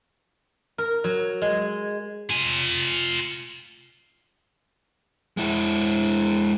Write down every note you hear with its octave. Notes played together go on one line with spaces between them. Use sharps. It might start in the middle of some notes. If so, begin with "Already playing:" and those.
A#4
F#3
G#3
F4 G#5
G#3 E4